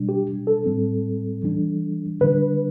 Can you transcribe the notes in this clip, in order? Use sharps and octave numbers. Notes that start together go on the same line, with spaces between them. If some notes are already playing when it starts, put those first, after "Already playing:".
Already playing: B2 G3 D4
G4
A4
A2 G3 C4
E3 G3 D4
D3 G3 D4 B4